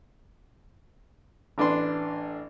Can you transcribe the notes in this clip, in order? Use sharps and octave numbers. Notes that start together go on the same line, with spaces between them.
A1 D4 B4 C6